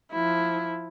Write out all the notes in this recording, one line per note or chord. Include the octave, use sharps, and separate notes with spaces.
F3 E4